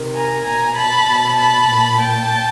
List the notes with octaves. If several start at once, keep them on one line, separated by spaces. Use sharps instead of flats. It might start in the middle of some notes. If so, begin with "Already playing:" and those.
Already playing: C3 D#3
G#5 A#5
B2 G#5 A#5
A5 B5
B2
A5 B5
A#2
G5 A5